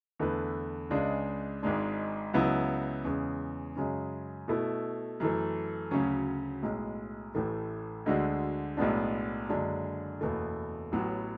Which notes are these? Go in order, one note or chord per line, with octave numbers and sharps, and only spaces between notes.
E2 D3 A3 E4 B4
C#2 C#3 G#3 D4
G#1 G#2 G#3 D4
C#2 C#3 F#3 B3 E4
E2 C#3 G#3 C#4
F#2 C#3 G#3 C#4
B2 A3 E4
F#2 E3 A3
D2 C#3 F#3 C#4
B1 A2 G#3
A1 A2 E3 A3
D2 D3 G#3 D4 F#4
B1 A2 G#3 B3 D4
F#1 F#2 D3 G#3 D4
F#1 E2 B2 A3
A1 A2 F#3 B3